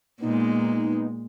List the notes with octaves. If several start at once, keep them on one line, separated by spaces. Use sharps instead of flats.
A#2 G#3 B3 D#4